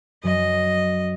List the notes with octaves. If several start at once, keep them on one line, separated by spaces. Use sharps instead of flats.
F#2 F#3 D#5